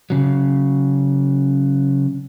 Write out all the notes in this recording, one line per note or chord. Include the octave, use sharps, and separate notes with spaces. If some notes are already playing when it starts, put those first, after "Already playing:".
C#3 F#3